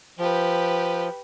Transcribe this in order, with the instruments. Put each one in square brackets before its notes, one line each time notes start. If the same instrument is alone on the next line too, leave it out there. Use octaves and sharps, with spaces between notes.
[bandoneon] F3 [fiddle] G4 B4